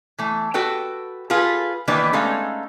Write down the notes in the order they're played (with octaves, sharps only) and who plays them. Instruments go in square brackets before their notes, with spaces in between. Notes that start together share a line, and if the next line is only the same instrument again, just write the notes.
[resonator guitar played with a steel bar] E3 A3
F#4 A4 B4 G5
F4 G#4 A4 B4
D#3 E3 A#3 D4 B4
G#3 A3 C#4 D#4 A4 F5